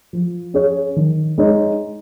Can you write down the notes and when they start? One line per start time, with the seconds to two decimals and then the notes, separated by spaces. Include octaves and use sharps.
0.13 F3
0.54 C#4 G#4 C#5
0.96 D#3
1.38 G#3 D#4 C#5